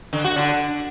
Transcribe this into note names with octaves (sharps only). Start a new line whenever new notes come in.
D3
F#4
D3